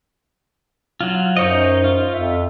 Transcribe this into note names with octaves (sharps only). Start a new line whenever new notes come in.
F#3 F4
F#2 D#4 C5 C#5 D#5
F4
F2 E5